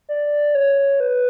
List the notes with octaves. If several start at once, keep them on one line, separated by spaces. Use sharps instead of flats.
D5
C#5
B4